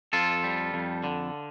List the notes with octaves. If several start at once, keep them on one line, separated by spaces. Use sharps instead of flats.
F2 F4 A4
G3
F2
D3